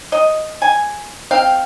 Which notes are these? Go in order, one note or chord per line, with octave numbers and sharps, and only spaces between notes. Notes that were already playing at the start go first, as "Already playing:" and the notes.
D#5
G#5
C4 F5 G5